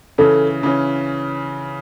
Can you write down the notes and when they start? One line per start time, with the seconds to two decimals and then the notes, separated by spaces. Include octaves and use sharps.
0.18 C#3 E3 C#4 A4
0.63 C#3 E3 C#4